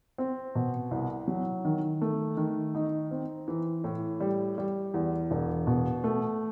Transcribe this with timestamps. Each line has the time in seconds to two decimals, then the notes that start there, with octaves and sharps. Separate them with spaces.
0.18 C4
0.55 B2
0.91 C2
1.28 F#3
1.65 D#3
2.01 A3
2.37 D#3
2.75 D#4
3.11 C4
3.48 E3
3.84 A2
4.20 G3
4.58 G3
4.94 E2
5.31 E1
5.67 B2
6.04 A3